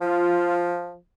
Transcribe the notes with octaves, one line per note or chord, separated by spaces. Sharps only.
F3 F4